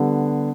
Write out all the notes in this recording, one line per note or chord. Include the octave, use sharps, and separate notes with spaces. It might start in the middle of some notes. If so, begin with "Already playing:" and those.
Already playing: D3 G3 B3